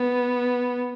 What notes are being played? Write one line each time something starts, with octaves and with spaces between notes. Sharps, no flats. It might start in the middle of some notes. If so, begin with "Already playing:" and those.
Already playing: B3